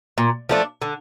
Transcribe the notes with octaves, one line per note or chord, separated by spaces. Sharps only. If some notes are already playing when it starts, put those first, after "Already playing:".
A#2
F3 A3 D4
D3